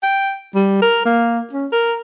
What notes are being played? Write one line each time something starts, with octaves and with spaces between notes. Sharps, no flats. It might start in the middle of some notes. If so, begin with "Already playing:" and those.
G5
G3
A#4
A#3
C#4
A#4